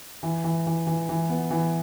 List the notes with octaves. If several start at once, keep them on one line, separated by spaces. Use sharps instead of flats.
E3
E3
E3
E3
E3
B3
E3